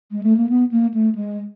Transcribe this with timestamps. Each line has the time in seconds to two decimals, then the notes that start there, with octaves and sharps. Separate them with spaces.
0.12 G#3
0.23 A3
0.37 A#3
0.49 B3
0.71 A#3
0.94 A3
1.15 G#3